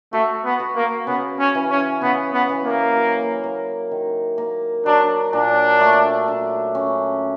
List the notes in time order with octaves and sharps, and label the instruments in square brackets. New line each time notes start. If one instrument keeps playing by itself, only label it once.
[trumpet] A3 [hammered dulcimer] F#4
[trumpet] B3
[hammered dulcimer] F#4
[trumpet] A#3
[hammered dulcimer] C#3 [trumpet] B3
[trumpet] C#4
[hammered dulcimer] E3
[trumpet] C#4
[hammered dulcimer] C#3 [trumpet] B3
[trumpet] B3
[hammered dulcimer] E3
[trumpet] A#3
[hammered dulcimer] F#3
A#3
D#3
A#3
[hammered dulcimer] F#3 [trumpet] D4
[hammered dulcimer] A#2 [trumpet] D4
[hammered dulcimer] A3
D4
C#4